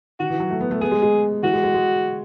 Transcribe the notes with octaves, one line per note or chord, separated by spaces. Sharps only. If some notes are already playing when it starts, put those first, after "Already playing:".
D#3 F#4
E3
F#3
A3
B3
A3
B3 G#4
G#3
G#3
E3 F#4
G#3
G#3
G#3